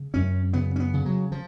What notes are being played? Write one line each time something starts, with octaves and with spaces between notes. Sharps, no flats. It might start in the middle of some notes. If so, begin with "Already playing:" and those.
Already playing: C#3
F#2 C#4
C#3 B3
C#4
B3
C#3
F#3
F3